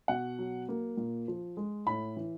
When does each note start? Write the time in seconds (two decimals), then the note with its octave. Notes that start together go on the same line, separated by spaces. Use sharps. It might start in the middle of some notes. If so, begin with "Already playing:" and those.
0.08 B2 F#5
0.39 F#3
0.69 A#3
0.97 A#2
1.28 F3
1.57 G#3
1.86 A2 B5
2.17 E3